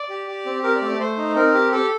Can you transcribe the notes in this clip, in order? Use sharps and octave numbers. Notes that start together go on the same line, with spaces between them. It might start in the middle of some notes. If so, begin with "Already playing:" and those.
Already playing: D5
G4
G4
C4
G4 A#4
D5
A3
D5
A3 C5
D#4
C4 A#4
G4
G4 A4